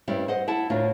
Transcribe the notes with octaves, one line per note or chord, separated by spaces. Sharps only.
G2 G3 C4 C#4 E4
C5 D#5 F#5
E4 F#5 A5
D2 A2 A#3 D4 F4